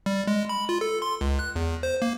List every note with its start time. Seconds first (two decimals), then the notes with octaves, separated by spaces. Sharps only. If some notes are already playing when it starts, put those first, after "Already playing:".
0.06 G3
0.27 G#3
0.49 B5
0.69 F4
0.81 A4
1.02 C6
1.21 C#2
1.39 F#6
1.56 E2
1.83 C5
2.02 A#3